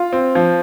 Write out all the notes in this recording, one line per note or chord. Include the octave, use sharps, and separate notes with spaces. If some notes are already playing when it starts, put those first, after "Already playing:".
Already playing: F4
C4
F3